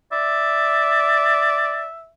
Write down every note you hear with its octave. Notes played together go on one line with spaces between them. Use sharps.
D5 E5